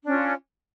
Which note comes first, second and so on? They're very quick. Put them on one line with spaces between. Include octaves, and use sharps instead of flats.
D4 C#4 F4